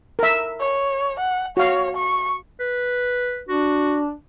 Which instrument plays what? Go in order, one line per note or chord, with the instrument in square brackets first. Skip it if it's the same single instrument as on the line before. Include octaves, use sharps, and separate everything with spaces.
[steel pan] A#4 E5
[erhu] C#5
F#5
[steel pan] F#4 F5 [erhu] C#5
[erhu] C#6
[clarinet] B4
[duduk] D4 [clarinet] F#4